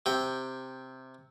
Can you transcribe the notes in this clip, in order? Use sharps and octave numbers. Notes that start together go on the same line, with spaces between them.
C3 G5